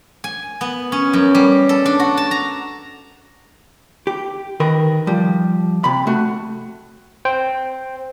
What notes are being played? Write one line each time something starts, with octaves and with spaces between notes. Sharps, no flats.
G#5
B3
C#4
F#2
G3
A4
D4
F#4
A5
A#5
G4
D#3 A#4 B4
F3 G3
C3 B5
A3 F#4
C5 G5